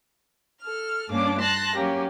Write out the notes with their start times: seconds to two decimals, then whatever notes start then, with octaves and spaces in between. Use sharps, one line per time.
0.61 A4 F6
1.09 G2 A#3 C#4 D4 D6
1.40 A5 C6 F#6 A#6
1.76 F#3 A#3 C#4 G4